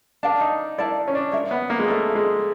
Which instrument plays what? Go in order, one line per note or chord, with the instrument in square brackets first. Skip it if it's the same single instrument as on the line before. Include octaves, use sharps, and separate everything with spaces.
[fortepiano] D4 [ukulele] A#4 D5 F5 A5
[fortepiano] D#4
[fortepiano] E4 [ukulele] A#4 D5 F5 A5
[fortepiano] C#4
D4
[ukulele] F4 A#4 C#5 E5
[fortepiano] B3
A#3
G#3
[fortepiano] A3 [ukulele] F4 A#4 C#5 E5
[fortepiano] G#3